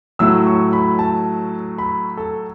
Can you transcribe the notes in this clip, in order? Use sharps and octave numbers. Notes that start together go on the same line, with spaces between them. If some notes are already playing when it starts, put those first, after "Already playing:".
A2 F#3 A3 E4 E6
C#6
B5
A5
B5
A4